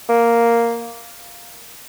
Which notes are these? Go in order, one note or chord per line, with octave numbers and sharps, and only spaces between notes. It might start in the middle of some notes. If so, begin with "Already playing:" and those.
A#3